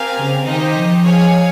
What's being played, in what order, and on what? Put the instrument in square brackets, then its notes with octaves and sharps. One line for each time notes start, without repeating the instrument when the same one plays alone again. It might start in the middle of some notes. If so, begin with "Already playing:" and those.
Already playing: [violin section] C4 G4 A#4 F5 G#5
[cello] C#3
[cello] D#3 [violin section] D#4 G4 C5 D#5
[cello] F3
[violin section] G#4 C#5 F5 G#5